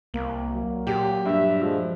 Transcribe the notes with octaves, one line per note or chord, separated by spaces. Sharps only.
C2 A#3
F#3
A#2 G4
G2 E5
F3 G#3 A3